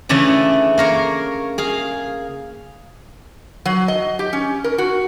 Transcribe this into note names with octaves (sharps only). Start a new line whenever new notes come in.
C#3 E3 A3 D4
A#3 A#4 C#5
G#4 F5
F#3
D#5
G4
C#4
A#4
F#4